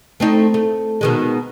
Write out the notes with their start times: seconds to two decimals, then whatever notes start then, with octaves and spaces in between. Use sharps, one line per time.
0.20 A3 C4 D#4
0.54 A3
1.01 B2 D#3 G#3